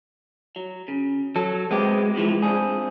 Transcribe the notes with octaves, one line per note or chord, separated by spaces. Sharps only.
F#3
C#3
F#3 A4
G#3 B3 C4 G4
C3 E3 F3
C4 D4 G#4